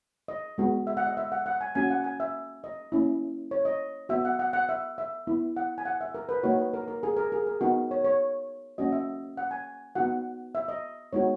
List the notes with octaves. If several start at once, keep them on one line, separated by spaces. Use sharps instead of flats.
D#5
G#3 B3 F#4
E5
F#5
D#5
E5
F#5
F#5
G#5
A#3 C#4 F#4 G#5
F#5
G#5
E5
D#5
A#3 C#4 E4
C#5
D#5
B3 F#4 E5
F#5
F#5
F#5
E5
E5
B3 E4
F#5
G#5
F#5
E5
A#4
B4
A#3 D#4 F#4 C#5
B4
A#4
A#4
G#4
A#4
G#4
A#4
B3 D#4 F#4
C#5
C#5
A#3 C#4 F#4 D#5
E5
F#5
G#5
B3 D#4 F#4 F#5
E5
D#5
G#3 B3 D#4 F#4 C#5